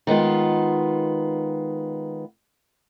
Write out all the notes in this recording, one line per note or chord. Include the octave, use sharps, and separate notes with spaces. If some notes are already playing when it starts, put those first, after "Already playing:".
D#3 G#3 B3 F4